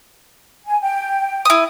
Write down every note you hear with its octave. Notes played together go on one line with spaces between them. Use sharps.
G#5
G5
E4 D#6